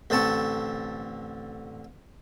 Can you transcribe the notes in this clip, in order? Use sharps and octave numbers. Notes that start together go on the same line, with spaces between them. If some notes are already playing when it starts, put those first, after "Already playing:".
A1 D3 C4 A5 C#6